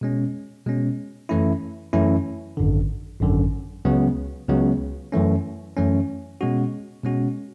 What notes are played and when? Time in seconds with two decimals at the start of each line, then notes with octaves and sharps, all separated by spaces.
0.01 B2 G#3 C#4
0.66 B2 G#3 C#4
1.29 F#2 E3 A3 C#4 E4
1.93 F#2 E3 A3 C#4 E4
2.57 G#1 F#2 D3
3.21 G#1 F#2 D3
3.85 C#2 C#3 F#3 B3
4.48 C#2 C#3 F#3 B3
5.12 F#2 E3 A3 C#4
5.77 F#2 E3 A3 C#4
6.41 B2 G#3 C#4 F#4
7.04 B2 G#3 C#4 F#4